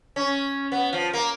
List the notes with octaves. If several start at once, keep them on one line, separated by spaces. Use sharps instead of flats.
C#4
B3
F3
A#3